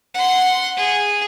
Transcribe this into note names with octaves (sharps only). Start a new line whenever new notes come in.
F#5 C6
G#4